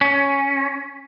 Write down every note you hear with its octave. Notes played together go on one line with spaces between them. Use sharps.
C#4